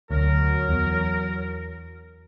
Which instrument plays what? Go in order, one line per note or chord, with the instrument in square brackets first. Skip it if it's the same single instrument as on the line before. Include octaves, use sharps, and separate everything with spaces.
[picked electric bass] D2 [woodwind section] F#3 A#4
[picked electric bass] E2